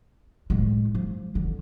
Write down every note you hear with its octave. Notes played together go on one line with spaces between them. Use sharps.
A2 G#3
F3 G#3
D3